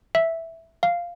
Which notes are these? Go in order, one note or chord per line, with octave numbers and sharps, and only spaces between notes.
E5
F5